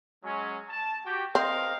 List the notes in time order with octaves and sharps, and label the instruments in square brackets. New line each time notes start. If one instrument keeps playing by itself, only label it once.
[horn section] F#3 G#3 C#4
A5
F#4 G4 G5
[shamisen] C4 [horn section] A#4 D#5 F5